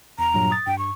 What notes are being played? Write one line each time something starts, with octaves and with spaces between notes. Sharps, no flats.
E2 A#5
G2 A#2 F#3
D#6 A6
G2 G5
C#6